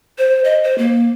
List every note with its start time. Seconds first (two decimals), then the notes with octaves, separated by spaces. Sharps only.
0.18 C5
0.45 D#5
0.64 C5
0.78 A#3